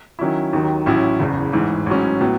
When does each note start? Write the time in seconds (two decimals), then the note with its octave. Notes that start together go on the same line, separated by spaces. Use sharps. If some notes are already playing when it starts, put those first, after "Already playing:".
0.19 D#3 F#3 C#4 E4
0.53 D#2 D#3 F#3
0.86 A1 A2 F#3 C#4 E4
1.20 F#1 E2 C#3
1.53 A1 G#2 E3
1.86 A1 G#2 F#3 C#4
2.21 A2 F#3 B3